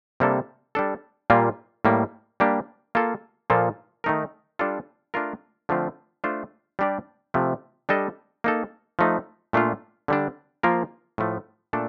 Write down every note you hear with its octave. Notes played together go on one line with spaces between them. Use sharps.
C3 G3 A#3 D4 A4
G3 D4 A4
A#2 G3 A#3 F4
A2 G3 A#3
G3 A#3 D4 G4
A#3 F4 A4
A#2 F3 A#3 F4 A4
D#3 A3 D#4 A#4
G3 D4 F4 A4
A3 D4 F4 A#4
D3 F3 A3 C4 F4
A3 D4 F4 C5
G3 D4 G4 D5
C3 F3 A3
G3 D4 A4 D#5
A#3 D#4 A4
F3 A3 D#4
A#2 A3 D4 F4
D3 G3 D4
F3 A#3 F4 A#4
A2 F3 A3
A#2 A3 D4 A4